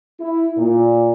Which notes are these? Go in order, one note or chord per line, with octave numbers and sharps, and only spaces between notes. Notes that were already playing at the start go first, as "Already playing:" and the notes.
E4
A#2